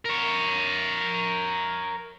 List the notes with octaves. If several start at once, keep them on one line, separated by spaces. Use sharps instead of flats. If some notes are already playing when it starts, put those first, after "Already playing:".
A#4 C#5